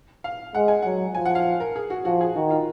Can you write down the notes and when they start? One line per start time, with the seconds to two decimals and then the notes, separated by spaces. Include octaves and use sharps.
0.24 F5
0.55 G#3 F#5
0.68 G#5
0.82 F#3 F#5
1.15 F3 G#5
1.25 F#5
1.35 F5
1.60 A#4
1.76 G#4
1.90 F#4
2.05 F3 F#4
2.21 G#4
2.36 D#3 F#4
2.50 F4